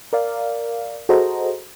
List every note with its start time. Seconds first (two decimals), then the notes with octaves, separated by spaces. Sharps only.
0.13 A#4 D5 F5
1.09 F#4 G#4 A4 C5 D#5 A#5